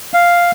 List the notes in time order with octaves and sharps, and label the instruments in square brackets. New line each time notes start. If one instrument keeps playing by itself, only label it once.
[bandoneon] F5